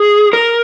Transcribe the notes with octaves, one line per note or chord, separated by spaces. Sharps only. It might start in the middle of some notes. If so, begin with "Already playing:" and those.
Already playing: G#4
A#4